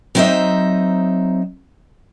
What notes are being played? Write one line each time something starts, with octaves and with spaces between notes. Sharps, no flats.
F#3 C4 D#4 C5 D#5 E5